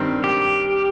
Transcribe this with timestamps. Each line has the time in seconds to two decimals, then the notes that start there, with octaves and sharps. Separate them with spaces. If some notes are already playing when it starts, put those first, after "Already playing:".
Already playing: G2 D#3 C4
0.24 G4